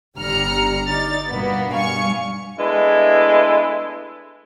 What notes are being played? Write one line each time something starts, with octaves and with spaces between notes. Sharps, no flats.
G1 D3 G3 A#5 F6 C#7
D#4 D5 A6
G2 B2 A#3 B3
G2 F5 G#5 C#6 C#7
G#3 A3 B3 D4 E4